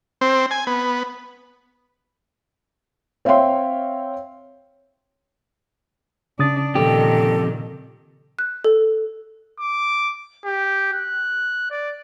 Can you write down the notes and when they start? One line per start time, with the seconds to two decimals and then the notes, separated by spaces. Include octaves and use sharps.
0.21 C4
0.51 G#5
0.67 B3
3.25 C4 C#5 E5 F5 G5 C6
6.39 C#3 D4 D#6 A6
6.75 F2 A#2 D#3 G4 A4
8.39 F#6
8.64 A4
9.60 D6
10.45 G4
10.93 F#6
11.71 D5